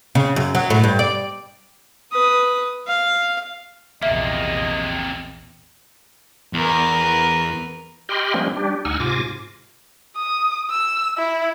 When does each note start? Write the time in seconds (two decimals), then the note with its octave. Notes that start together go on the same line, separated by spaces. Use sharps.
0.15 C#3
0.36 F#2
0.55 F#3
0.70 A2
0.84 G2
0.99 D5
2.12 B4 D#6
2.87 F5
4.03 A#1 E2 C3 A#3 D#5 E5
6.53 E2 A#4 B4
8.09 G4 D#5 G5 B5 C6 F6
8.34 F3 G3 G#3 A#3 B3 C#4
8.56 G3 D4 G4
8.85 D2 D#4 F#5 G#5 E6 F6
9.00 G#2 C3 F4 G#5 D6 A#6
10.16 D#6
10.71 E6
11.18 E4